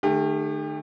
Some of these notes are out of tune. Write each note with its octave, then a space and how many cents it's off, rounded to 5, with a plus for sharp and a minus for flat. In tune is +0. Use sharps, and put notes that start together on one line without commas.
D#3 -40 A3 +0 G4 +35